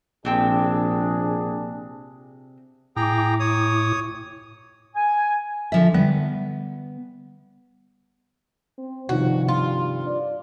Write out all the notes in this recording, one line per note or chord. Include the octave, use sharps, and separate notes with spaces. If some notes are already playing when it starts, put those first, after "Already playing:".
A#1 C3 C4 D4 G#4 G5
A2 E4 G#4 G5 A#5 D6
C#5 D#6
G#5
D3 F3 E5
D3 G3 B3
C4
G2 C3 D#3 F3 F#4
F4
D5